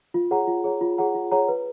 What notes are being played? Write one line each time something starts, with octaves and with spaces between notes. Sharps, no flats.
F4
G#4 C#5 F#5 A#5
F4
G#4 C#5 F#5 A#5
F4
G#4 C#5 F#5 A#5
F4
G#4 C#5 F#5 A#5
B4